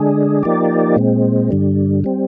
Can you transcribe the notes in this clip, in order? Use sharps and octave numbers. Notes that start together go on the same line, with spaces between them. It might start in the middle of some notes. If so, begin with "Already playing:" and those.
Already playing: D3 G#3 D4 G#4
F3 A#3 D#4 G4 D5
A#2 G#3 C4
G2 D3 G3
G3 C4